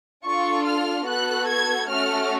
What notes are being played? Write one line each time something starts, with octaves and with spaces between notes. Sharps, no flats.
D4 F4 A4 C#6
F6
B3 F#4 A4 F#6
G#6
A3 C#4 F#4 A4 F6